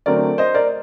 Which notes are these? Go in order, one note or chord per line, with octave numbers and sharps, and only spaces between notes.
D3 F#3 A3 C4 A#4 D5
C5 D#5
A#4 D5